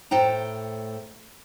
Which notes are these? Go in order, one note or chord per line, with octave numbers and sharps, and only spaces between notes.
A2 A4 C5 G5 A#5